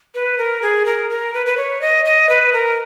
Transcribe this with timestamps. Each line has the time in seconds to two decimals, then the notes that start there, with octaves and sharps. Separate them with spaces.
0.15 B4
0.38 A#4
0.62 G#4
0.86 A#4
1.10 A#4
1.34 B4
1.46 B4
1.57 C#5
1.81 D#5
2.05 D#5
2.29 B4
2.53 A#4